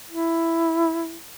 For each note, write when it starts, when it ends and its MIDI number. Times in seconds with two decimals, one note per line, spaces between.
0.09 1.16 64